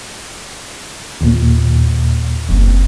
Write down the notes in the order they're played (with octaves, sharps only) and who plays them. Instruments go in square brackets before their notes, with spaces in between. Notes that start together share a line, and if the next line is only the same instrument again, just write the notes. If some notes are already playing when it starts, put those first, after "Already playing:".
[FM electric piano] D#2 A#2
[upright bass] F#1 C4